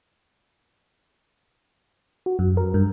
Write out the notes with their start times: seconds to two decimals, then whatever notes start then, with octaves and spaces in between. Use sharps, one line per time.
2.26 F#4
2.39 F#2
2.57 A#4
2.74 G2